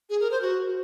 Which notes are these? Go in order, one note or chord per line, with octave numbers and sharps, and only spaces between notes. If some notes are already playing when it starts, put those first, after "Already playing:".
G#4
A#4
C5
F#4